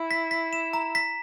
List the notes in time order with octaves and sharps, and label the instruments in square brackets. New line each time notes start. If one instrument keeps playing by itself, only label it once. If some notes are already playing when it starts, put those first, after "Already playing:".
Already playing: [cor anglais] E4
[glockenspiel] B6
B6
E7
A#5
B6